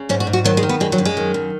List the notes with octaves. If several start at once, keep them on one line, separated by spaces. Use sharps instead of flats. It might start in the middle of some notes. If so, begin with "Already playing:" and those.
Already playing: C#3
G#2 C#4
F#4
G#2
F#4
D#3 F#3
G#3
D#3
B3
F#2 G#3
F#3
F#2
G#3
D#3
F#2